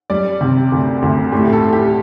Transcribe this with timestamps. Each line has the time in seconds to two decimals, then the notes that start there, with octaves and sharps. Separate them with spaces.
0.10 G3 D5
0.41 C3
0.72 D2
1.02 D2
1.32 A2 G4
1.53 A4
1.63 A2
1.73 G4